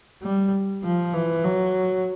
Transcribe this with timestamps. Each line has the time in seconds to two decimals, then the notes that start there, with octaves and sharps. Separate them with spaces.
0.21 G3
0.83 F3
1.13 E3
1.44 F#3